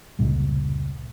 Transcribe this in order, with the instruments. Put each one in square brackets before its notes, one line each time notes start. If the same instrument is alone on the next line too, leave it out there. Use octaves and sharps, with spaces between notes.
[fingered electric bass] F1 C#2 A#2 G3